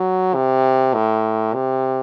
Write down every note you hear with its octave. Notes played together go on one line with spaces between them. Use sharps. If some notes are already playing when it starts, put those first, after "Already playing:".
Already playing: F#3
C3
A2
C3